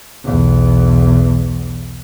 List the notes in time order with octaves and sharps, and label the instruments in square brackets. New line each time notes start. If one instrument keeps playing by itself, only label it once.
[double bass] B1 E2